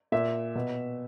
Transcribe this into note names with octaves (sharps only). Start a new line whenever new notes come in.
A#2 E5
B2